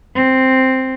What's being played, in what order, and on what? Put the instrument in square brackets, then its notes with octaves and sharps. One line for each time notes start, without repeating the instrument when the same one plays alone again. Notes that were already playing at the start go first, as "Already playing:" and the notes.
[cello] C4